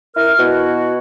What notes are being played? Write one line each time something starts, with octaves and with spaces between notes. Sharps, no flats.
E4 A#4 F6
B2 E4 F#4